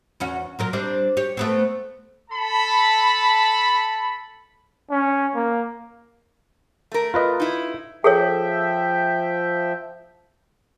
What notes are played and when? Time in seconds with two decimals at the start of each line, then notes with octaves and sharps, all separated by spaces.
0.20 E2 C#4 F#4
0.59 A#2 F#3 A#4
0.73 G3 C4 D4
1.17 G4 C#5
1.37 A3 B3 C4
2.31 A4 A5 B5
4.90 C#4
5.36 A#3
6.92 A3 A#4
7.14 F4 B4 D#5
7.40 D#4 E4
8.04 F3 G#4 A4 C#5 E5 G5